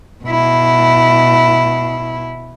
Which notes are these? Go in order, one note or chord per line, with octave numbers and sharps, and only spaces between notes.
B2 E4